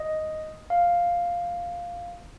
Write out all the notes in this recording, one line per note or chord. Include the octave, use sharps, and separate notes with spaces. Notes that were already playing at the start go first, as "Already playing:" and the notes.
Already playing: D#5
F5